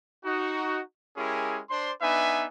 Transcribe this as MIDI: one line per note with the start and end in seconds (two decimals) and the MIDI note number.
0.24 0.81 63
0.24 0.81 66
1.16 1.60 56
1.16 1.60 61
1.16 1.60 64
1.16 1.60 67
1.16 1.60 68
1.16 1.60 70
1.69 1.91 62
1.69 1.91 72
1.69 1.91 74
1.69 1.91 84
2.01 2.45 59
2.01 2.45 62
2.01 2.45 63
2.01 2.45 71
2.01 2.45 76
2.01 2.45 80